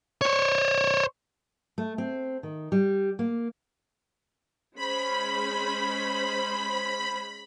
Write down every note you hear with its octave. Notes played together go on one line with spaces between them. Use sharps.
C5 C#5
A3
C4
D#3
G3
A#3
G#3 C#4 C5 B5